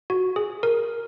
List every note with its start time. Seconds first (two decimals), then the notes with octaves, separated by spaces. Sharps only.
0.10 F#4
0.36 G#4
0.63 A#4